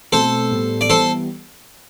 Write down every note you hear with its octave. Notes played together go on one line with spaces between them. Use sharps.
B2 A3 C4 A4 C5
A2 G3 B3
D5
E3 G3 B3 A4 C5